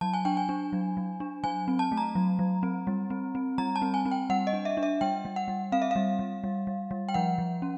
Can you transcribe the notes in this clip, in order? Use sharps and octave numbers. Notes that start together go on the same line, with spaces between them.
F#3 A5
G#5
D4 G5
G#5
D4
F#3
F#3
D4
F#3 G#5
C4
A5
A3
A#5
F#3
F#3
C4
G3
C4
C4
G3 A#5
A5
C4
G#5
C4
G5
G3 F#5
D#5
D4
E5
D4
E5
G3 G5
G3
F#5
G3
C4 F5
E5
G3 F5
G3
G3
G3
G3
G5
F3 F#5
F3
C#4